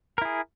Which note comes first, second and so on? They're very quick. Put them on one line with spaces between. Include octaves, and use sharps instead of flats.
A#4 E4 G#4